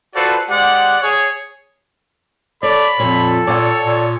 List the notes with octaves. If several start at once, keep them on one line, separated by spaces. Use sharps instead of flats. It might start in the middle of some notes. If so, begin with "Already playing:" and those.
F4 F#4 A4 B4 C5 D5
G#3 G4 C5 D5 F#5
G#4 C#5
A4 C#5 D5 B5
F2 A#2 A4 C#5
A#2 C#5 D5 F#5
A#2